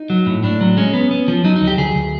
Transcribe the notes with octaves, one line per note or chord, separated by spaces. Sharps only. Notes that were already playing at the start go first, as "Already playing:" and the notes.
Already playing: D#4
F#3
A2
A2 D4
F#3
G#3 C#4
B3
B3
F3
F#3 D#4
D2 D#4
G4
D2 G#4
D2